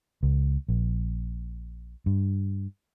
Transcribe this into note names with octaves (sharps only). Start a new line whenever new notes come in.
C#2
A#1
G2